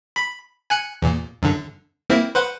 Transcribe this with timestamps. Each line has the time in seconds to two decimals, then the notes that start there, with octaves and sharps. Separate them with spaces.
0.16 B5
0.70 G#5 F#6 C#7
1.02 E2 A#2
1.42 F#2 D3
2.10 A#3 C4 E4
2.35 B4 C5 F#5